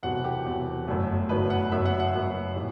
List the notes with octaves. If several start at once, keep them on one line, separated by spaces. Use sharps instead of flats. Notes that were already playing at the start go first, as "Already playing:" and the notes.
E1 E2 C3 F#3 B3 F#5
G4
E1 E2 C3 F#3 B3
G1 F#2 F#3 A3
G1 F#2 F#3 A3 B4
F#5
F#1 F#2 F#3 B3 E5
F#5
F#5
F#1 F#2 F#3 B3
A2 E3 G3